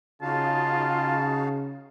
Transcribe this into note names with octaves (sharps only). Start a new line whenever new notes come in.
C#3 D#4 F4 F#4 F5 A5